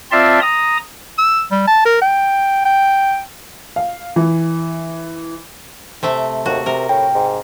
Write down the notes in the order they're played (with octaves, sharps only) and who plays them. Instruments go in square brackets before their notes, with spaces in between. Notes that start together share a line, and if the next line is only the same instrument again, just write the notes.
[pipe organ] C4 F4 D5 E5 A5 C6
A#5 D#6
[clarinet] E6
G3
A5
A#4
G5
G5
[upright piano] F5
E3
[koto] C3 A3 E5
[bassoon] D#2 [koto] F#4
[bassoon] C3 [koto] A#4
[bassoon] A2 [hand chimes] G5
[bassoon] G#2